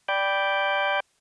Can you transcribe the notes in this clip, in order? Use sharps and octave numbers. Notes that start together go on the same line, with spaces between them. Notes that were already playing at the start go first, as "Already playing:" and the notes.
D5 G5 B5 D6 G6